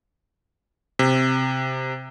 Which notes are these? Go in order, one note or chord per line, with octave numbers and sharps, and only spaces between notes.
C3